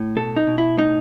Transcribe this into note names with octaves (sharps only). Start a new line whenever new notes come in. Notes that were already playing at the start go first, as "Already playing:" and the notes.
Already playing: A2
B2 A4
D#4
B2
E4
A2 D#4